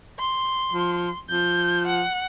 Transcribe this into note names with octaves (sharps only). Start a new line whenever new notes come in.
C6
F3
F3 G6
F#5